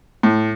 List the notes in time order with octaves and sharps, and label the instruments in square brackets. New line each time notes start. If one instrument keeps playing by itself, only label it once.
[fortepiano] A2